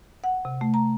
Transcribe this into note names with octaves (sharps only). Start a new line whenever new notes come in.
F#5
C3
A3
A#5